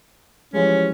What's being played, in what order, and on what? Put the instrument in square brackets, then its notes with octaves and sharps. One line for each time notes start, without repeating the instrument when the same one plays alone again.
[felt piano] E3 F3 G#3 [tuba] G3 [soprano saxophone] C#4